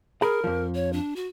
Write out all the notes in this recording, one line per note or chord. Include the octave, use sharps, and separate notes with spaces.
G#4 A#4 A#5 B5
F2 F3
C#5
D4
F#4